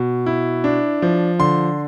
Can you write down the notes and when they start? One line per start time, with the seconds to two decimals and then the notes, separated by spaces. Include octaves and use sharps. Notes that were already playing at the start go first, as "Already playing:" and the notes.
Already playing: B2
0.26 E4
0.64 D4
1.02 F3
1.39 D3 C6